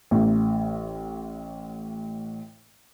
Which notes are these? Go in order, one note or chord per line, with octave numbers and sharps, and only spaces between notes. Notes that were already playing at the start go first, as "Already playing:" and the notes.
A1 A2